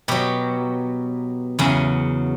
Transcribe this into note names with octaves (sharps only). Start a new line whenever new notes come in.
B2 F#3 G4
E2 C#3 F#3